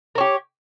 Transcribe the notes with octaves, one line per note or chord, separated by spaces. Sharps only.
G4 A#4 C#5